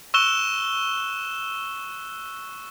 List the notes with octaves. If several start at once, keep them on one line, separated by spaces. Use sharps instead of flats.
C#6 E6 F#6 E7 G7